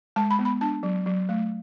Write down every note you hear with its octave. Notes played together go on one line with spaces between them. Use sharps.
G#3 A5
B5
B3
B5
D4 A5
F#3
F#3
A3